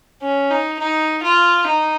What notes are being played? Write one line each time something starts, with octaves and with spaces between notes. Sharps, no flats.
C#4
D#4
D#4
F4
D#4